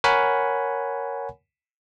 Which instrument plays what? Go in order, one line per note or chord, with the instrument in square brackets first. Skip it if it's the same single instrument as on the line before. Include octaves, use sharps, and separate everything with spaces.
[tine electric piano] A#4 C#5 F#5 G#5 B5